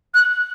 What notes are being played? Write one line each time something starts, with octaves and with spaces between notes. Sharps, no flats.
F#6